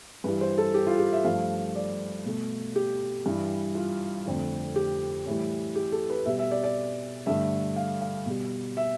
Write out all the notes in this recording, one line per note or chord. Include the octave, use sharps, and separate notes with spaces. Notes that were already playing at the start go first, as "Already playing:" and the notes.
G2 E3 G3 B4
C5
A4
G4
F4
G4
E5
G2 F3 A3 F5
D5
B2 A3
G4
G2 E3 G3
F4
F2 D3 A3
G4
A2 E3 G3
G4
A4
B4
B2 G3 E5
E5
D5
D5
G2 D3 A3 E5
F5
F5
B2 G3
E5